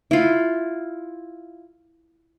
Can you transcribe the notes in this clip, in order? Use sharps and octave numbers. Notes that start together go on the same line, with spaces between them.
E4 F4